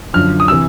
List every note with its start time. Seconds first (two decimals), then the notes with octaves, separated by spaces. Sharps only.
0.13 F#2 D3 F3 F6
0.40 D#6
0.48 C3 E3 E6